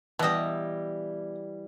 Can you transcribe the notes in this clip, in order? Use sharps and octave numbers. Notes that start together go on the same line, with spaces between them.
B2 E3 G3 D#5